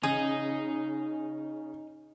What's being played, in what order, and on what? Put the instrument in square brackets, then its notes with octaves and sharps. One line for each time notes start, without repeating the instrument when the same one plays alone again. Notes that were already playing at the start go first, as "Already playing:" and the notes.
[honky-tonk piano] C#3 [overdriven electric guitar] D#4 [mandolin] G#4 D#6